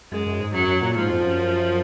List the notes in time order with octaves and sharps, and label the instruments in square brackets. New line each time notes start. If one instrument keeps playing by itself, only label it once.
[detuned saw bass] F#2 [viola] G#3
[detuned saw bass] F#2
G#2
[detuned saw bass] F#2 [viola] F#3
[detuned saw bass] F#2
A#2
[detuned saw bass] G#2 [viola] F3
[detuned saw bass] F2
F#2